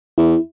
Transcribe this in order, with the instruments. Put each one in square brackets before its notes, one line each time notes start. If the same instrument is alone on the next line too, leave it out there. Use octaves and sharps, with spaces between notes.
[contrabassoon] E2 [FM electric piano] E4